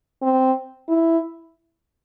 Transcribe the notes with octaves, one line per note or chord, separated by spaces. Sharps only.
C4
E4